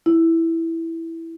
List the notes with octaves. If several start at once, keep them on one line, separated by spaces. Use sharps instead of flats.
E4